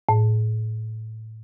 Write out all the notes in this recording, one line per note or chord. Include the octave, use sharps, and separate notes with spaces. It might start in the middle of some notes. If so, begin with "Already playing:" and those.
A2